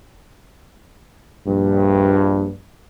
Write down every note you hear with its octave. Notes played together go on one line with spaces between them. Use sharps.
A#1 G2